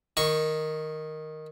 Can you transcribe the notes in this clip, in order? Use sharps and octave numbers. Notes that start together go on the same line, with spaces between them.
D#3 C#6